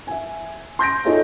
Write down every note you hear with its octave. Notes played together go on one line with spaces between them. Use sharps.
E5 G#5
C6 G6 A#6 D7
D#4 F4 G#4 A4 C#5 E5